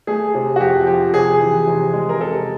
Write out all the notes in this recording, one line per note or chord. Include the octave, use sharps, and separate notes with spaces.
A3 G#4
C3
F#4
F2 G4
F3 G4
C3 G#4
E3
C3
G#3
A#4
C3 A4